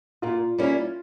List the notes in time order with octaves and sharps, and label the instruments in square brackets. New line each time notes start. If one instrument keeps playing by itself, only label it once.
[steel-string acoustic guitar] A#2 [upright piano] F4
[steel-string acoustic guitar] G3 A#3 C#4 E4